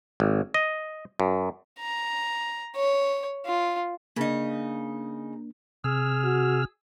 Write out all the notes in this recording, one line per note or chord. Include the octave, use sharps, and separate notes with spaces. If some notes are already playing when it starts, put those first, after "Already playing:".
G#1
D#5
F#2
A#5
C#5
F4
C#3 A#3 D4 D#4
C3 G#4 E6 F6
F#4